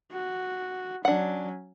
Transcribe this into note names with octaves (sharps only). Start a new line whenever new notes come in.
F#4
F#3 C#4 D4 F#5